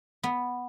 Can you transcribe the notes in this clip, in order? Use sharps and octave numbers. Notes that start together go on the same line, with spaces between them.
B3